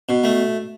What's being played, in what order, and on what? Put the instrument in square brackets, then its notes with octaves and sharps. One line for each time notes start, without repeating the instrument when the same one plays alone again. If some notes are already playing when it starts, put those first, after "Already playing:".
[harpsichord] B2
A3